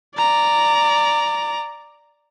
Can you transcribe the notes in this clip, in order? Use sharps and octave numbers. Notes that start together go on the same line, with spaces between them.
D5 A#5